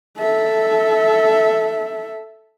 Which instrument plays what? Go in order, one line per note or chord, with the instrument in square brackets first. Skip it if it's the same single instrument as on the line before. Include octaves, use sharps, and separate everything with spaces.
[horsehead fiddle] A4 E5